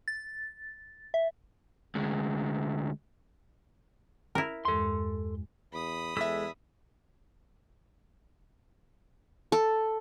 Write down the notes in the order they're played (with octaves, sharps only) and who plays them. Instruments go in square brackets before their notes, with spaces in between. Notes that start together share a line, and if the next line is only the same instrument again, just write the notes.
[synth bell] A6
E5
[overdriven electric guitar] D2 G#3
[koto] E4 A#4
[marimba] E2 G2 G#3 [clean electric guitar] A4 C6
[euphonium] E2 [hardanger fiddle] B5 D#6
[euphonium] E2 [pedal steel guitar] G#3 A4 E6 [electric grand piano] E5 B6
[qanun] A4